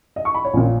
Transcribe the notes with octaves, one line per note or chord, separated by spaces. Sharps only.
D#5
C#6
B5
C#5
A#1 A#2